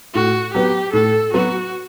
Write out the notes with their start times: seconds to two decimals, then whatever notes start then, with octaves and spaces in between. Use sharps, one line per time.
0.14 A2 F#4
0.54 F#3 B3 G4
0.93 A2 A4
1.33 F#3 B3 F#4